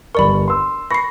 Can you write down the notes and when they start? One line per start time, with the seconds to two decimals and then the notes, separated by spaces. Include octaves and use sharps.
0.15 G1 A#4 D5 B5 C#6
0.48 C6 E6
0.91 B5 C#6 A#6 C7